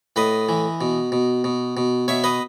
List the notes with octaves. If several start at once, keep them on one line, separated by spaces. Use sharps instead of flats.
A2 B4 D#5
E3
B2
B2
B2
B2
B2 C#5 E5
B4 D#5